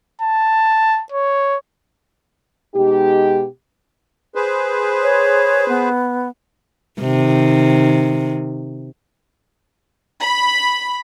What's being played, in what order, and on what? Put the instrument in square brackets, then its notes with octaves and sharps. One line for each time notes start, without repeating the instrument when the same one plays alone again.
[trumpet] A5
C#5
[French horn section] B2 G#3 D#4 G4
[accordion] G#4 B4 C5
[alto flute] C#5
B3
[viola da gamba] C3 D#3
[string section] B5